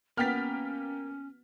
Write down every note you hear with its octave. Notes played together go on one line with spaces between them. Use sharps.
A#3 B3 C#4 G5 F6 A6 B6